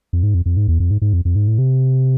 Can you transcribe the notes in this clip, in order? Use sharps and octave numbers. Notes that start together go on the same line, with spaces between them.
F2
G#2
F2
F2
G#2
E2
F2
G#2
G#2
F2
F2
G#2
A2
C3